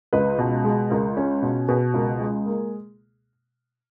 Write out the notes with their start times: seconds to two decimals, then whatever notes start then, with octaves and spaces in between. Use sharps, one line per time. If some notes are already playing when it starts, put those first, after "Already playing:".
0.13 C#2 B4 D#5
0.39 B2
0.64 G#3
0.90 C#2 A#4
1.17 C#4
1.43 B2
1.68 B2 G#4 B4
1.94 C#2 A#4
2.20 G#3 G#4
2.46 A#3